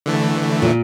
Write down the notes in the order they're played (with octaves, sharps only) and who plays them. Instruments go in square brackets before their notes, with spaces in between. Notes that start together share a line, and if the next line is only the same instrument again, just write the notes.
[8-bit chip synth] D3 E3 A3
[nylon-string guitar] A#2